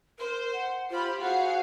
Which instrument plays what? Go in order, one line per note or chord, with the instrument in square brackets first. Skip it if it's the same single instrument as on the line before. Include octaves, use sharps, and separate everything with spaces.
[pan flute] A#4 [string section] C5
[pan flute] F#5
[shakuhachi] F4 [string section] G4 B5 [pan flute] C5
[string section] F#4 G#4 F5 [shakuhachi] F#5